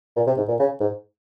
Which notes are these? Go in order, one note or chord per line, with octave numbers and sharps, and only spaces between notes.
A#2
C3
G#2
A#2
C#3
G#2